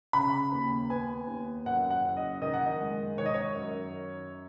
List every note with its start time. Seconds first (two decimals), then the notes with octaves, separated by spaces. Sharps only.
0.13 C#3 B5
0.52 D#2
0.90 B3 G#5
1.27 D#2
1.66 F#2 F#5
1.91 F#5
2.04 F#1
2.17 D#5
2.42 D#3 D#5
2.54 F#5
2.66 D#5
2.81 G#3
3.17 D#3 C#5
3.26 D#5
3.34 C#5
3.55 F#2